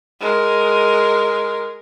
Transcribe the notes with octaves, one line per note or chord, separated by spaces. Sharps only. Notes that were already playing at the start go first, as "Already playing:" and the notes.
G#3 A#4